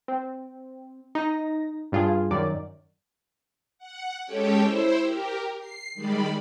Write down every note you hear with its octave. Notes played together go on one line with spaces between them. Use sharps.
C4
D#4 A#6
G2 F4 G#4
F#2 D#3 D5
F#5
G#3 C#4 G4 A4 C#5 G5
E4 C5 E5
G4 A#4
C7
D#3 G3 G#3 D5 B5